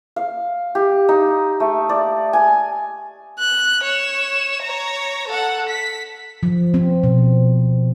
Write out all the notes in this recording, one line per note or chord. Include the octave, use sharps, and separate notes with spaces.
F5
G4
D#4
A3
D5
G#5
F#6
C#5 E7
C#5 A#5
A4 F#5
B6
F3
C4
B2